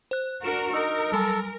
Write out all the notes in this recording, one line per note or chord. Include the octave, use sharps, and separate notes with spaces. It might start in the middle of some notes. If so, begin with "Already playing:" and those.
C5 F#6
D4 F#4 A#4 E7
D#4 A#4 E6
F#3 G3 A4 G#5